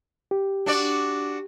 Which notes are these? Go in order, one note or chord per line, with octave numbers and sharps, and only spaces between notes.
G4
D4 F#4 D5